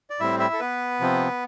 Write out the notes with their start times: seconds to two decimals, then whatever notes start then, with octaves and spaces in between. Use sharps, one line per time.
0.10 D5
0.20 A2 G3 C4 E4 E5
0.40 E4 E5
0.53 A4
0.60 B3 B4
1.00 C3 F3 C4